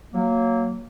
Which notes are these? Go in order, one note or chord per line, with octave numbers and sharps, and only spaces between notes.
F#3 A#3